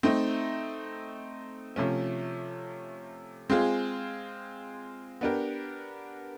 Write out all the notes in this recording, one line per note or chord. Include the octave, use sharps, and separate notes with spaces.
A3 C4 D#4
C3 F3 A3 C#4
G#3 C4 F4 G#4
B3 D4 G4 A#4